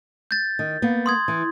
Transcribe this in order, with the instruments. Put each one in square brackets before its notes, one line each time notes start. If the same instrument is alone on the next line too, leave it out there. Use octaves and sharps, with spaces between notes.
[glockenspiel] G6 A6
[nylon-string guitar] D#3
A#3 B3
[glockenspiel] C6 D#6 G#6
[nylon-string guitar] E3